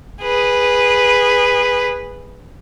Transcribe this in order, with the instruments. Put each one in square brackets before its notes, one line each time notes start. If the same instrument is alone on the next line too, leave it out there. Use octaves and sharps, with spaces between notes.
[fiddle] G#4 B4